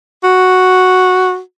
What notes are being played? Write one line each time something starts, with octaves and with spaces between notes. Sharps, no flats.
F#4